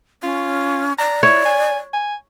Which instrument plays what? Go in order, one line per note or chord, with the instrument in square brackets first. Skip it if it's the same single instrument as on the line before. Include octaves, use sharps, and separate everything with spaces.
[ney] C#4 [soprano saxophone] F4
[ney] D5 [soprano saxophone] A#5
[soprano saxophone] E4 [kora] C#5
[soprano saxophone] G#5
G#5